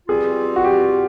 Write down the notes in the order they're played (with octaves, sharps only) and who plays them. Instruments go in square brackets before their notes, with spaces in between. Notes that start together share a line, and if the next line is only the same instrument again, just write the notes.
[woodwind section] B2 G3 C4 F4 [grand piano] G#4
[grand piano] F#4
G4